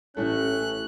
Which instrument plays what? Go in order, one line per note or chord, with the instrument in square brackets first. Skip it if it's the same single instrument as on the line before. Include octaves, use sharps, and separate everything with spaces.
[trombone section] A1 C#4 [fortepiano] A2 A3 [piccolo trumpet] F#6